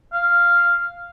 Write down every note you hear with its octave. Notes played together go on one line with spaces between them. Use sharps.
F5